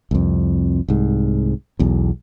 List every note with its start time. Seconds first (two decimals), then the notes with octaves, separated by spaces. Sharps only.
0.11 C2 F2
0.89 C2 G#2
1.79 B1 E2